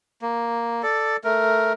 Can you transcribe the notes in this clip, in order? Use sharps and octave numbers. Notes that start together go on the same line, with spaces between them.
A#3
A4 D5
A3 A#4